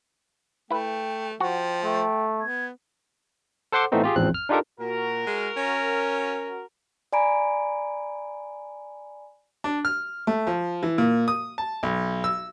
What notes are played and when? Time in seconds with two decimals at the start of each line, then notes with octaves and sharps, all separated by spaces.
0.71 A3 E4 B4 G5
1.40 F3 F#4 G5
1.85 A3 G5
2.41 B3 G#6
3.72 A4 C5 F#5 C6 D6
3.92 A2 E3 A3 B3 C4 D#4
4.03 F4 G4 G#4
4.16 A1 E2 G#2 F3 C4 F#6
4.34 F6
4.49 D4 D#4 F4 G4 A4 A#4
4.79 A#2 F#4 A#4
5.26 G#3
5.56 C#4
7.13 D5 G#5 A#5 B5 D7
9.64 D4
9.85 F6
10.27 A3
10.47 F3
10.83 E3
10.98 A#2
11.28 D#6
11.58 A5
11.83 B1
12.24 E6